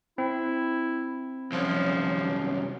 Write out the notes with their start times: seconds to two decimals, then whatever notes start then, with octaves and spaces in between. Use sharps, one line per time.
0.18 C4 E4
1.52 C2 F#2 F3